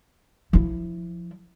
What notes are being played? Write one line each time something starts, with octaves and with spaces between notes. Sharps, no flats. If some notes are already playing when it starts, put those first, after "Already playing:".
F3 E4